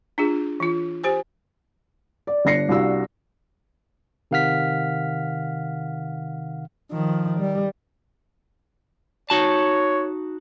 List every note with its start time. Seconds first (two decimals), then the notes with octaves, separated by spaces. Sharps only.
0.18 D4 F4 G#4
0.60 E3 F4
1.04 G4 C5 G#5
2.27 D5
2.45 G1 D4 A#6 C7 C#7
2.69 C2 D4 F#4 F5 E6
4.31 C3 D#3 F5 F#5 F6 B6
6.91 D#3 F3
7.40 G3
9.30 D#4 F#4 C#5 A5